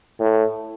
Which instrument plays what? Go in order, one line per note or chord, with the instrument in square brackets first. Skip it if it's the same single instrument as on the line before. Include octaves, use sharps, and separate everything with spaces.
[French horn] A2